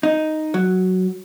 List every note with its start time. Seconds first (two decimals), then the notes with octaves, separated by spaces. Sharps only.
0.03 D#4
0.54 F#3